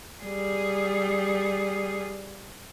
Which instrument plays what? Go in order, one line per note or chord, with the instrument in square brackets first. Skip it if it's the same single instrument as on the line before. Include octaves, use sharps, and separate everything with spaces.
[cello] G3 G#4